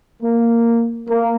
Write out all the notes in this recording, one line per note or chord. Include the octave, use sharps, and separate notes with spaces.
A#3
A#3